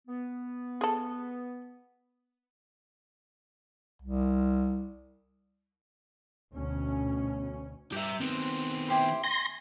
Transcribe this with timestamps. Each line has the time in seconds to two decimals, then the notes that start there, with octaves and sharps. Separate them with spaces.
0.08 B3
0.81 G#4 A4
4.02 C2
6.52 D2 B2 C#4
7.92 G2 G4 E5
8.20 D#3 B3 C4
8.89 E4 G4 C5
9.24 G#5 C6 A#6